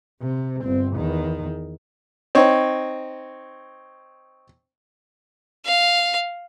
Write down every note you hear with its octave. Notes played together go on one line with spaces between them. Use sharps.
C3
G1 C4
E2 D#3
C4 D#4 C#5
F5